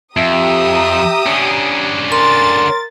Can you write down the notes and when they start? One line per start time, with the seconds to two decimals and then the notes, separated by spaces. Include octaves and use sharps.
0.17 F2 G4 E5 A#5 D#6
1.27 D3 C#4
2.12 A#4 C6 A6